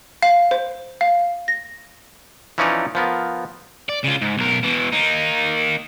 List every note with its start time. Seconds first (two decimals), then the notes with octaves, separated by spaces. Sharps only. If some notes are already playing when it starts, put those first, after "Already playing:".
0.22 F5
0.51 C5
1.01 F5
1.48 A#6
2.58 E3 F3 C#4 D#4 C#5 D5
2.95 F3 B3 A#4
3.89 D5
4.04 C#3 F4
4.21 G#2
4.38 B1 A#4
4.63 B2 E3
4.93 A#3 D#4